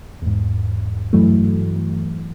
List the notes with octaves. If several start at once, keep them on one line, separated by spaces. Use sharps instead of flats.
E2 G#2
G2 E3 F#3 A3